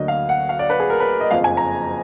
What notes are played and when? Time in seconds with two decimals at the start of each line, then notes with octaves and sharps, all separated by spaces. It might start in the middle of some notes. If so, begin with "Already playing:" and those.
Already playing: D2 D3 F#3 A#3 D#5
0.08 F5
0.29 F#5
0.49 F5
0.59 D5
0.70 B4
0.80 G#4
0.90 A#4
1.00 B4
1.21 D#5
1.31 F#1 F2 F3 F5
1.44 G#5
1.57 A#5